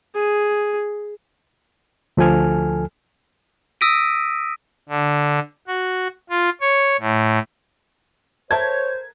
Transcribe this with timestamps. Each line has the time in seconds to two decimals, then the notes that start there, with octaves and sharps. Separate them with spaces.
0.15 G#4
2.17 D2 F3 A4 G#5 F6
3.81 D#6 E6 A#6 B6 D7 D#7
4.89 D3
5.67 F#4
6.29 F4
6.61 C#5
7.00 A2
8.51 A4 A#4 C5 C#5 E5 G#6